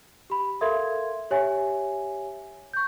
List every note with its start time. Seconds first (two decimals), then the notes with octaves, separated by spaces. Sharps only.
0.30 G4 B5
0.61 A4 A#4 E5 F5 C6 G#6
1.31 G4 C#5 E5 G#5
2.74 C#6 G6